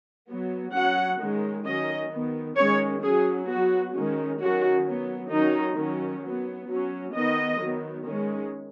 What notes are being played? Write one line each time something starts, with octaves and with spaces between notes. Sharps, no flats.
F#3 B3
F#3 C#4 F#5
D#3 G#3 C#4
D#3 F#3 C#4 D#5
D#3 B3
D#3 G#3 C#4 C#5
F#3 C#4 G#4
F#3 B3 F#4
D#3 G#3 C#4
D#3 F#3 C#4 F#4
F#3 B3
D#3 F#3 C#4 D#4
D#3 F#3 C#4
F#3 B3
F#3 C#4
D#3 B3 D#5
D#3 F#3 B3
D#3 G#3 C#4